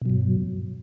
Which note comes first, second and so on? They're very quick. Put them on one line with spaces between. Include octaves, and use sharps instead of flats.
B2 F#3 G2